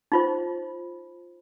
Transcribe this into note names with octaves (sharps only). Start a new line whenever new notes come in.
D#4 F4 C5